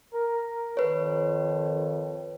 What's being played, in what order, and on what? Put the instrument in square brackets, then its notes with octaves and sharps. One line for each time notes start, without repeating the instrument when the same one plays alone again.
[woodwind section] A#4
[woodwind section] F2 D#3 [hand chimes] B4 C#5